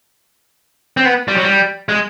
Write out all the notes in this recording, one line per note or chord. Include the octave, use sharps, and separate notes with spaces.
C4
B3
G3
F#3
G3
G#3